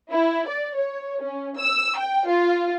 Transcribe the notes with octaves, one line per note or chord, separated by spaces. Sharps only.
E4
D5
C#5
C#4
E6
G5
F4